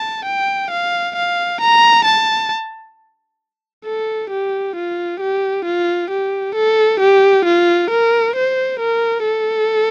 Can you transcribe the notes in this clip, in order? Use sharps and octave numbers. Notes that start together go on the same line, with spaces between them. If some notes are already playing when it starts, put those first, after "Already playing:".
Already playing: A5
G5
F5
F5
A#5
A5
A4
G4
F4
G4
F4
G4
A4
G4
F4
A#4
C5
A#4
A4